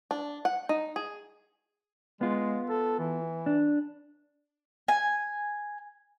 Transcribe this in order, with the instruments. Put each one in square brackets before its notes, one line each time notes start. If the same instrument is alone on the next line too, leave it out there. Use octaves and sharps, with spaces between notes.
[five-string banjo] D4
F#5
D#4
G#4
[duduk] G#3 [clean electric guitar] B3 F4
[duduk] A4
E3
[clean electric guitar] D4
[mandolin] G#5